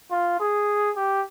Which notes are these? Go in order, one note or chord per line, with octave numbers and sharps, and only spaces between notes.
F4
G#4
G4